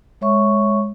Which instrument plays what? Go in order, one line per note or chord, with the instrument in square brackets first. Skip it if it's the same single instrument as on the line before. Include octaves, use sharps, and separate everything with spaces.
[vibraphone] G#3 C#5 E5 C#6